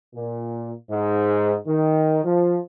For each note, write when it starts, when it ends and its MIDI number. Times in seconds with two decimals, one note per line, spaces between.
0.15 0.74 46
0.91 1.56 44
1.67 2.25 51
2.25 2.58 53